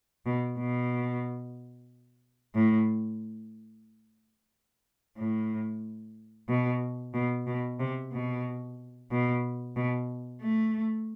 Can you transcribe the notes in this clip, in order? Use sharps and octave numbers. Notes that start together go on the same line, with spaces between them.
B2
B2
A2
A2
B2
B2
B2
C3
B2
B2
B2
A3